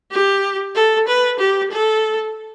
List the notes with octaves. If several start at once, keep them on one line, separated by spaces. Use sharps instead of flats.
G4
A4
B4
G4
A4